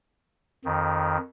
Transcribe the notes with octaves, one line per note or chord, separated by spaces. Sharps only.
F2 D#3